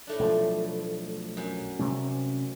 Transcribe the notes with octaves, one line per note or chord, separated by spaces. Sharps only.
A2 A3 D4
B1 F3
F#2
C3 G3 C#4